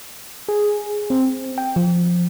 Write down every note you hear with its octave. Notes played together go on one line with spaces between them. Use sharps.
G#4
C4
G5
F3